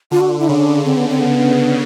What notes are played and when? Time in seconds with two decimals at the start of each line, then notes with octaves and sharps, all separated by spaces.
0.11 D3 F4
0.21 F#4
0.30 F4
0.39 E4
0.48 C#3 D4
0.85 C4
0.97 B3
1.09 C4
1.21 B3